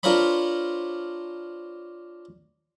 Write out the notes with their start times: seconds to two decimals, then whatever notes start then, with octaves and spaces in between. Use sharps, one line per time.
0.03 D4 F4 A#4 C5 C#5 B5